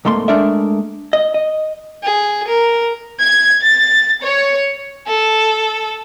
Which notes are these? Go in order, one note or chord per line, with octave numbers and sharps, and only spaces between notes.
C2 G#2 A3 A#3 C6
G#3 A3 D4 A#4 D5 E5
D#5
D#5
G#4
A#4
G#6
A6
C#5
A4